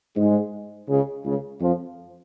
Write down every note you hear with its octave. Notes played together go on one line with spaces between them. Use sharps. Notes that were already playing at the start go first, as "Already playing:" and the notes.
G#2 G#3
C#2 C#3
C#2 C#3
F2 F3